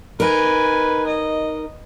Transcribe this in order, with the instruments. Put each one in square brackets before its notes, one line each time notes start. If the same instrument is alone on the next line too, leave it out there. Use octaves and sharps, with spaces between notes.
[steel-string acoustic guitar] D#4 A#4 [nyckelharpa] B4 G#5
[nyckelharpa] D#5